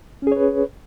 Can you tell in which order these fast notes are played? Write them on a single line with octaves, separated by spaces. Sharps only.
C#4 G#4 C#5 B4